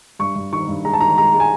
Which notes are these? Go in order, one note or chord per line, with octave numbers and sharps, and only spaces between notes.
G2 C#6
G2
D#3 C#6
G2
G#3 A#5
A5
D#3 A#5
G#3 A#5
G#3
G#5